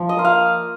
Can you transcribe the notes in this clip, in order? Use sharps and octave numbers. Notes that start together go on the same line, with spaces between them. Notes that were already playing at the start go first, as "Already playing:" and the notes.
Already playing: F3
D#5
A#3 F4
F5